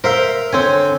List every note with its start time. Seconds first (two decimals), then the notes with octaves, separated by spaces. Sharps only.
0.04 A#4 C5 E5 F5
0.53 D3 C4 C#5 G#5